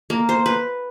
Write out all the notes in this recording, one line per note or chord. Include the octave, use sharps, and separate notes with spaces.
A#3
C5
B4